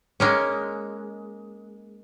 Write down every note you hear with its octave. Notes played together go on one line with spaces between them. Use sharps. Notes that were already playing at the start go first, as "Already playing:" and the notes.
G#3 A#3 C#4